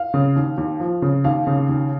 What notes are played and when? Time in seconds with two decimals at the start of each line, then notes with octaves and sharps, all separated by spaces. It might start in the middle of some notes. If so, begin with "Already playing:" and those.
Already playing: F5
0.14 C#3
0.36 D#2
0.58 D#2
0.80 F3
1.02 C#3
1.24 D#2 F5
1.47 C#3
1.69 D#2